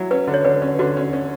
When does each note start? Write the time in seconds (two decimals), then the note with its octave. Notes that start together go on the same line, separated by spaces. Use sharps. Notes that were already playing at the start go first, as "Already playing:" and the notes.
Already playing: F#3 E4
0.11 C#4 B4
0.27 D3
0.34 C#5
0.45 D3 B4
0.62 C#4
0.79 D3 F#4
0.97 C#4
1.13 C#4